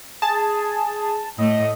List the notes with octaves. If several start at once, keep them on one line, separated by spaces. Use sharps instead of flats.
G#4 A5
A2 A3 D#5